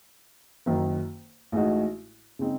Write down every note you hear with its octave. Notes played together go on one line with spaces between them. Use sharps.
F#1 F#2 D#3
A1 A2 G#3 D#4 F#4
C#3 G#3 C4 D#4